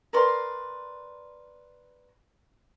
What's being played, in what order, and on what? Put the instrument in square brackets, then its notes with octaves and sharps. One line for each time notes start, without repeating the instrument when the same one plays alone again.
[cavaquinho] A#4 B4 D5 C6